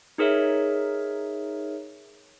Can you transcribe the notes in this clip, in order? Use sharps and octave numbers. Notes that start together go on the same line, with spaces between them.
D#4 G#4 A#4 C#5 E5